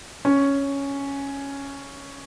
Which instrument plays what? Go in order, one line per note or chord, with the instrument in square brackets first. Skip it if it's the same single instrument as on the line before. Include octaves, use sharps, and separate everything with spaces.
[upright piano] C#4